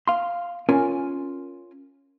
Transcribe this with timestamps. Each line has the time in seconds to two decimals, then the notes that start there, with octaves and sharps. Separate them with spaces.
0.08 F5 C6
0.69 C#4 F4 A#4 G#5